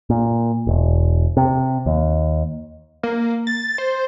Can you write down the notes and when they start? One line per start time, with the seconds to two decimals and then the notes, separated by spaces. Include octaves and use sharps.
0.10 A#2
0.67 E1
1.37 C3
1.86 D#2
3.03 A#3
3.47 A6
3.78 C5